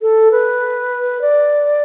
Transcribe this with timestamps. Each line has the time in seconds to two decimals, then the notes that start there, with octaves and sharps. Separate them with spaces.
0.02 A4
0.32 B4
1.21 D5